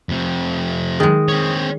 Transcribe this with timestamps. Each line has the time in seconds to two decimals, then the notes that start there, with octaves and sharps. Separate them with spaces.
0.09 F2 C3
1.00 D#3 G#3 G#4
1.29 C4 C#5